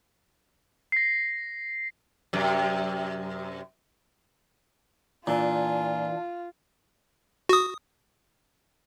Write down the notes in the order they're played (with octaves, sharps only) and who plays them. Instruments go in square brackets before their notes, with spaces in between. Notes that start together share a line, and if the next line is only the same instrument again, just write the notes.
[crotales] A#6 C7
[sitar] F#2 C3
[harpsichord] A#2 [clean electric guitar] E3 D4 [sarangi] F4 [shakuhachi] G#5
[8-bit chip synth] F#4 D#6